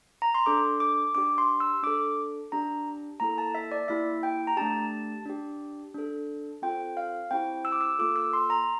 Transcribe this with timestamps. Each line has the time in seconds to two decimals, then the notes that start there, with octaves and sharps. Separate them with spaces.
0.22 A#5
0.35 C6
0.46 D4 A4 D6
0.80 D6
1.15 D4 G4 D6
1.38 C6
1.60 E6
1.83 D4 A4 D6
2.52 D4 G4 A#5
3.20 A#3 E4 A4 A#5
3.38 A5
3.55 E5
3.72 D5
3.88 A#3 E4 G4 E5
4.23 G5
4.47 A#5
4.57 A3 D4 G4 A5
5.26 D4 G4
5.95 D4 A4
6.62 C4 F4 A4 G5
6.97 F5
7.31 C4 E4 G4 G5
7.65 E6
7.72 D6
7.81 E6
7.99 A#3 F4 A4 D6
8.16 E6
8.33 C6
8.50 A#5